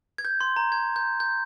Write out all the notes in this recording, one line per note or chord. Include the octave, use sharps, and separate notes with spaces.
G#6
G6
C6
A#5
G#6
G6
G6